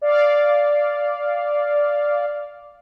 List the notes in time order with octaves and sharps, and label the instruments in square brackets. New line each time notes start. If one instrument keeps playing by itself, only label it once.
[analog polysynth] D5 F5